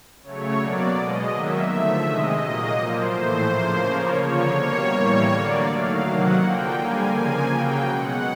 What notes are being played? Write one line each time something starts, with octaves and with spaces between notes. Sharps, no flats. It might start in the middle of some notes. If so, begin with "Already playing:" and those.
C#3 F#3 A3 C#5
B2 F#3 A#3 D5
B2 G#3 D#5
D#3 F#3 A#3 E5
D3 F3 A3 E5
C3 D#3 G#3 D#5
A#2 F#3 A#3
A#2 F3 A#3 C5
A2 E3 A3
C#3 F3 A#3
C#3 F3 A#3 C#5
D3 F3 A#3 C#5
B2 G3 A#3
A2 E3 G3 A#3
D3 F#3 A#3 D5
D#3 F#3 A3 F5
C3 D#3 F#3 A#3 F#5
D3 F3 A#3 G5
D3 G3 A#3 G#5
C#3 F3 A#3 G#5
C#3 F#3 A#3 G5
B2 G#3 F#5